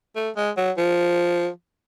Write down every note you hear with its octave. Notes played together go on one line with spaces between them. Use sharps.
A3
G#3
F#3
F3